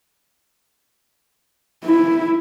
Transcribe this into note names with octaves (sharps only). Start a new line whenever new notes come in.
E4